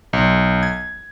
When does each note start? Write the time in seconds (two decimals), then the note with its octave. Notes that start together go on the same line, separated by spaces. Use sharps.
0.13 B1
0.63 G#6